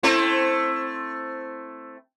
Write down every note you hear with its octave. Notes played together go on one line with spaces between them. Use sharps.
A3 C4 E4